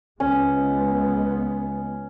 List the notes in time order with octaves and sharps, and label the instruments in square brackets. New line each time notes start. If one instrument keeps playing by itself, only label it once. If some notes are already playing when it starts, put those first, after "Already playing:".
[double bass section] C#2 G#3 B3 [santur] C#4